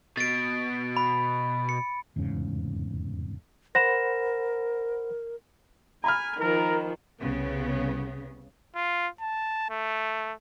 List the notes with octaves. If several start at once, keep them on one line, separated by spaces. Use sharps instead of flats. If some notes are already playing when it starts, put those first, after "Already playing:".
B2 A6 D7
B5
C#7
F1 E2 G#2 C#3
A#4 C5 F#5 B5 A#6 E7
G#5 A#5 B5 F6
D#3 F3 A#4
C2 C#3 B3
F4
A5
A3